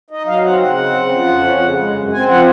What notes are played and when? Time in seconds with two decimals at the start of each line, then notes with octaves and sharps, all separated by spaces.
0.10 D#4 D#5
0.27 F#3 F5
0.45 C4 F#5
0.61 C#3 F#5
0.78 C4
0.95 C#3
1.12 F3
1.28 F2
1.44 C#4
1.61 C#3
1.78 G#3
1.95 F#2
2.12 C4 G#5
2.28 F3 F#5